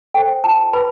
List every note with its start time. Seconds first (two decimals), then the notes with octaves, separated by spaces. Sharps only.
0.14 A4 C5 G5
0.44 F4 A5
0.73 B4 B5